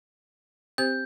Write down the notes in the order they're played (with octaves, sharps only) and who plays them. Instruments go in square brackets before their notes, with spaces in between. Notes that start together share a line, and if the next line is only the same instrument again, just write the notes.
[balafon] C4 G4 C5 [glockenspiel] G6